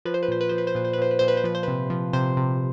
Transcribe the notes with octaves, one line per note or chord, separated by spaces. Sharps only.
F3 B4
C5
B4
A#2 C5
B4
F3 C5
B4
C5
A#2 B4
C5
B4
A#2 C5
B4
A#2 C5
B4
C5
F3 B4
C5
C3 B4
F3
C3 C5
C3